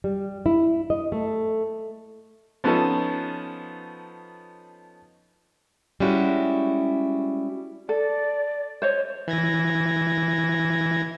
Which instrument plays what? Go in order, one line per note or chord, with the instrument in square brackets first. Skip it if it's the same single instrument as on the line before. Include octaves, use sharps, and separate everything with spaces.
[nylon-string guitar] G3
E4
D#5
A3
[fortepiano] F3 B3 C#4 D#4 A4
[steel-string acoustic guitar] G3 G#3 C#4 E4 F#4
[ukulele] A4 [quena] D5
[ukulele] C5 C#5 D#5
[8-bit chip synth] E3 G#6 A#6